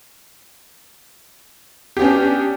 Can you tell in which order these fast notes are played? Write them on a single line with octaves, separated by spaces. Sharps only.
G4 B3 C#4 D4